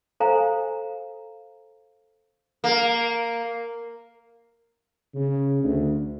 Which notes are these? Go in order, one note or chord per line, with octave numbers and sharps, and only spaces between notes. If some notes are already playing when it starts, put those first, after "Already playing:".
A4 C5 F5 G5 G#5 A#5
A#3
C#3
D2